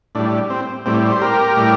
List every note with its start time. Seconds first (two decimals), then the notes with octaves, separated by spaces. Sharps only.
0.15 A2 G3 D4
0.50 C4
0.86 A2 G3 C4
1.12 C5
1.22 G4 A#4
1.56 A2 G3